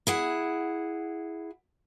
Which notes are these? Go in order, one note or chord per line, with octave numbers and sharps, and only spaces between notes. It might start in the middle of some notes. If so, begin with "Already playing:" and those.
E4 G#4 F#5